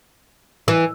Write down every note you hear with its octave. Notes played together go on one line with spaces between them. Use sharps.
E3